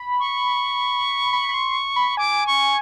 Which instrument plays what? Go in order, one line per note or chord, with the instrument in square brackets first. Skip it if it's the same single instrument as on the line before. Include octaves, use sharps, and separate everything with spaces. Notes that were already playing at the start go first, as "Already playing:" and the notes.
Already playing: [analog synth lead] B5
[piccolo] C#6
[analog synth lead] B5
B5
C6
B5
[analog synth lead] G#5 [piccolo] D6
[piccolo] C#6